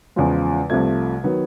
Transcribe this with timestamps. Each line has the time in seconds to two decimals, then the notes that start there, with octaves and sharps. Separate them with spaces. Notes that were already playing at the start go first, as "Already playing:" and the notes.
0.16 E2 C#3 F3 G#3
0.70 C2 C3 F3 A3 G#6
1.24 D#3 F#3 B3